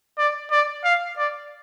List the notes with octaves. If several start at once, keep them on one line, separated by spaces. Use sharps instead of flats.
D5
D5
F5
D5